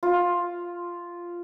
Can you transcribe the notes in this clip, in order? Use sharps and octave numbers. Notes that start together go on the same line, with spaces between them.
F4